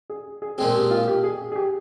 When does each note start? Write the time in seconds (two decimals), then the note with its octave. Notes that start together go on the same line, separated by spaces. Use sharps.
0.10 G#4
0.42 G#4
0.58 A#2 F3 G#3 C4 G#4
0.75 G4
0.91 F4
1.08 G4
1.24 G#4
1.52 G#4
1.56 G4